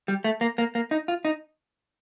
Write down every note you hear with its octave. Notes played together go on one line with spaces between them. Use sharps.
G3
A3
A#3
A#3
A#3
D#4
F4
D#4